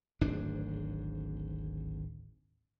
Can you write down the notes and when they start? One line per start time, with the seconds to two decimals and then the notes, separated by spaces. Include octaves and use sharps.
0.21 D1 G#1 G#2 D4